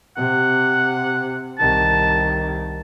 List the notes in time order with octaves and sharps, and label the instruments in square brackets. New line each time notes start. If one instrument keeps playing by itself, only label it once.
[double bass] C3 [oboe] F#5
[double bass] C2 D#3 [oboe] A5